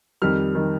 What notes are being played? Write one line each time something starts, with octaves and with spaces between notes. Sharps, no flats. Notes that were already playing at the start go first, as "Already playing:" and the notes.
F2 D#3 G3 F6
D#3 G3